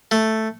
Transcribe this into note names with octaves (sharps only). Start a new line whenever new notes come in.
A3